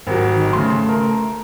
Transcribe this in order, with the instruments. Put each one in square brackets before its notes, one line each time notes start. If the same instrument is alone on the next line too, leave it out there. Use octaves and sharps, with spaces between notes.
[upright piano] G#1 F#3 [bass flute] A#4
[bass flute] D#3
[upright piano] C#3 C6 [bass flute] A3
[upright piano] A#4